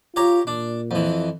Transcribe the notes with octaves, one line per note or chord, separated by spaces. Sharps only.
F4 G4 C#5 A#5
A#2 D4
F2 E3